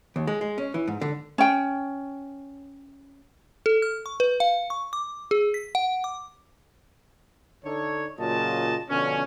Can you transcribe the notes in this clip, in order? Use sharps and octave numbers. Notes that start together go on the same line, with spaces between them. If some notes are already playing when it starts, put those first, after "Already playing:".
D#2
G#3
G#3
C#4
E3
G#2
D3
C#4 G5
A4
F6
C#6
B4
F5
C#6
D6
G#4
B6
F#5
D6
D3 D4 D#4 A4 C#5
A#2 C#3 F#3 F4 D#5 A5
B2 D3 F3 C#4